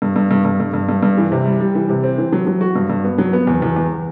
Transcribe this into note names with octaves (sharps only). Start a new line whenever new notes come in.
G2
G2
G2
G2
G2
G2
G2
G2
E3
C3
G3
G3
E3
C3
C4
E3
F#3
F#3
F#4
G2
G2
B3
F#3
B3
E2
E2
E2